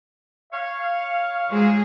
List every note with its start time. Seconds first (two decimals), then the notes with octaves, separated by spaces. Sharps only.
0.53 C#5 F5
1.51 F3 F#3 G#3 G#4